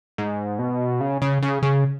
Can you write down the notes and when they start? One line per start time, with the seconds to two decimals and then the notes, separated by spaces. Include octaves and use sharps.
0.18 G#2
0.59 B2
1.00 C#3
1.22 C#3
1.42 C#3
1.63 C#3